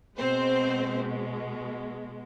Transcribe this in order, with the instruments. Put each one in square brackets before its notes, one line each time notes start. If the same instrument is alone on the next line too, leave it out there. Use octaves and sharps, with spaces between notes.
[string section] B2 G#3 C4 C5